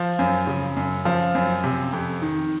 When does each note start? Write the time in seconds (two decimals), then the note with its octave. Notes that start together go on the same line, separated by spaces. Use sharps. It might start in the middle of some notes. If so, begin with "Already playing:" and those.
Already playing: F3
0.19 F#2
0.47 C#3
0.77 F#2
1.05 F3
1.35 F#2
1.64 C3
1.93 F2
2.22 D#3